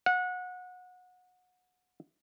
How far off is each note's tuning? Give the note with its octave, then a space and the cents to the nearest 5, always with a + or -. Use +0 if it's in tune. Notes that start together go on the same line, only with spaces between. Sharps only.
F#5 -25